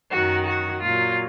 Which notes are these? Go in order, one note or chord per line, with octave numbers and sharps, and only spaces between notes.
F#2 D#3 F#3 F#4
F#4
A#2 F#3 F4